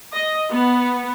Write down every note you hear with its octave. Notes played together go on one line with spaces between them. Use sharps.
D#5
B3